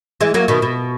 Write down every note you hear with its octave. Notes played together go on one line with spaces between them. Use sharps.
E3 G#3
F#3 A#3
B2 D#3
B2